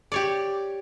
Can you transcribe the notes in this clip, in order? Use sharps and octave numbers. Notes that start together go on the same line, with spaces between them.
G4 C#5 D5